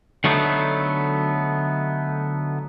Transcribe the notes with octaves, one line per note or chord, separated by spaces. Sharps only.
D3 F#3 A3 B3 D#4